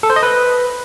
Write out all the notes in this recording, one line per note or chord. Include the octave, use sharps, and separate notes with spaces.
A4
C5
D#5
B4